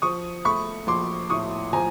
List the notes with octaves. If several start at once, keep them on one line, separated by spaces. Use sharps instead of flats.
F3 C#6 D#6
A3 B5 C#6
A#1 C6 D6
A2 C#6 D#6
F3 G#5 A#5